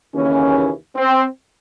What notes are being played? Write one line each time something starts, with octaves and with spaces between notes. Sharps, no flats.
D#2 C#3 E3 C#4
C4